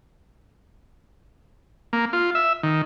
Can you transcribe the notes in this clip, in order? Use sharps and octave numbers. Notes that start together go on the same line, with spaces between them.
A#3
F4
E5
D#3